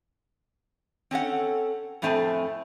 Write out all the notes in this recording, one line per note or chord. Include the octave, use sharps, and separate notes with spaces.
C4 C#4 A4 F#5
F2 A2 A3 C4 G#5 A5